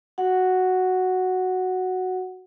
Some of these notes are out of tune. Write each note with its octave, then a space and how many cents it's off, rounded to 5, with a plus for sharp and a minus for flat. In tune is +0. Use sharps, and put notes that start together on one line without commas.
F#4 +0 F#5 +0